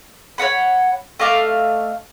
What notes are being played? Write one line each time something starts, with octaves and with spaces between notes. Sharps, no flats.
C#5 D5 F#5 B5
A3 D#5 F5 D6